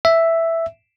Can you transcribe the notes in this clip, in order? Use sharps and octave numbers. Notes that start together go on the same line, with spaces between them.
E5